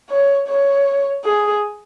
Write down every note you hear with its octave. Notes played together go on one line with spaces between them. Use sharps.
C#5
C#5
G#4